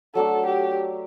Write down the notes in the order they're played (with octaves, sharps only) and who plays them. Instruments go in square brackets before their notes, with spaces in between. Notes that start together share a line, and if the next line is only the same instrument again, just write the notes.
[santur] F#3 A3 D4 [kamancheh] A4
[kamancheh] G4